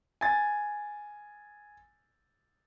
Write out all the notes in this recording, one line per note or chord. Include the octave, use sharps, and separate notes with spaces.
G#5 A6